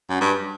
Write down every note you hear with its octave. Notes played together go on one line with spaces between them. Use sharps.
F#2
G2